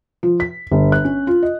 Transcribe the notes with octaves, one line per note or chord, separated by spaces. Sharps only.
F3
B6
G1
F#6
C#4
F4
D#5